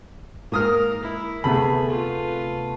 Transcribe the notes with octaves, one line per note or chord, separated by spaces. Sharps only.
G#2 A#3 A#4 D#6 F6
E4
D2 C3 A3 B3 G#4 B5
F4 B4